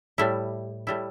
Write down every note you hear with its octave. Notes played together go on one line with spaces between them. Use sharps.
A2 G3 E4
A2 G3 E4